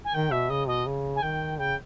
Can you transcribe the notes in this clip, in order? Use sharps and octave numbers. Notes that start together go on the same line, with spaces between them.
G#5
D#3 G5
B2 E5
C#3 D#5
B2 D#5
C#3
G#5
D#3 G5
C#3 G5